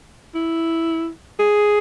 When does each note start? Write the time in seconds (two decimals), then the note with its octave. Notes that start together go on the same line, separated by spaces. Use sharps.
0.35 E4
1.39 G#4